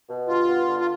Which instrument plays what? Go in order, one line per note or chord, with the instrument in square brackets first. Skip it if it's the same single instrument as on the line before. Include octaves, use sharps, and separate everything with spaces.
[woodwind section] B2
[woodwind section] G2 [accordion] F4
[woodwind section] B3
D3
[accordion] F4